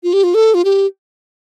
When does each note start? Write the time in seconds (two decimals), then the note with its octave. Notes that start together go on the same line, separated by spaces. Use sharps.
0.04 F4
0.13 G4
0.24 F4
0.34 A4
0.54 F4
0.65 G4